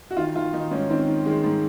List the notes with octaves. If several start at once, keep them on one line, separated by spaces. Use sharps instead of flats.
F#4
D#3 F4
D#3 F4
D#3 D#4
G#2 C#4
D#3 C4
D#3
D#3 G#3
G#2